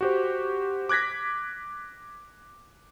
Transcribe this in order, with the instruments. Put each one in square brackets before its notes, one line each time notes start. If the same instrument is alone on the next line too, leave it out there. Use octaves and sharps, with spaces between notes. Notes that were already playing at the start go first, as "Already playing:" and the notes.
[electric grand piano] F#4 G4 C5
D6 F#6 G#6 A#6 B6